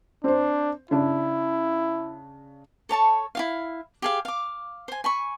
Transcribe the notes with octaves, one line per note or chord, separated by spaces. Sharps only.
C4 D4 C5
C#3 D4 E4
A4 C#5 A5 C#6
E4 F4 F5
G4 G#4 F5
F5 D6
C5 G#5
G#5 B5 C#6